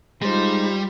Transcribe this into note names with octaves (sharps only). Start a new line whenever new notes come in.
G3 G#3 D#4 F4 C5